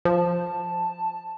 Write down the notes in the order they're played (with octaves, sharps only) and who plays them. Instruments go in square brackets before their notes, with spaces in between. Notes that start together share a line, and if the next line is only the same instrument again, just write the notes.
[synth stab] F3 [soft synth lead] A5